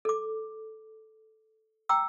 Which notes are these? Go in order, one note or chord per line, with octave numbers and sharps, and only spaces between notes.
A4 D6
G5 A#5 D6 E6